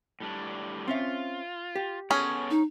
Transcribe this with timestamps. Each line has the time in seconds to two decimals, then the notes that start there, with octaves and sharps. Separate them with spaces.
0.20 A2 G3 D4
0.88 C4 C#4 F4 E5
1.75 G4
2.11 B3 C#4 G#4 A4 C#5
2.51 D#4